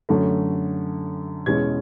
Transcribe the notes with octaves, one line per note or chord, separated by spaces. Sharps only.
F#2 D3 A3 C#4
E2 B2 G#3 C#4 G#6